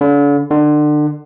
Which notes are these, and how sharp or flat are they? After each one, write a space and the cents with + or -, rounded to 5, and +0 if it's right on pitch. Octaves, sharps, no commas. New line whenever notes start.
D3 -40
D3 +30